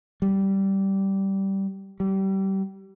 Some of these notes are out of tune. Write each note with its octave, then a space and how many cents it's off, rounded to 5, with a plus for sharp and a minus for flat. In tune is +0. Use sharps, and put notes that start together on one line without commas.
G3 -10
G3 -25